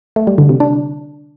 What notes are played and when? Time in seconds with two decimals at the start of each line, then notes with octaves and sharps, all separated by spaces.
0.16 A3
0.27 G3
0.38 D3
0.49 C3
0.60 D4